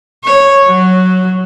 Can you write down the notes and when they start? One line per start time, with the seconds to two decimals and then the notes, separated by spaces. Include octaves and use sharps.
0.24 C#5
0.66 F#3